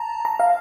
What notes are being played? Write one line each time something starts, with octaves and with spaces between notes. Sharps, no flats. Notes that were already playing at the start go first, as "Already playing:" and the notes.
Already playing: A5 A#5
A#5
F5